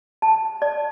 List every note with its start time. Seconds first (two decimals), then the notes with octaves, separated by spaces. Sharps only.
0.22 A5
0.62 D5